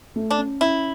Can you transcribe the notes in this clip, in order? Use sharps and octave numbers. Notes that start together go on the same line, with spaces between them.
A3
D4
C#4
C#4 E4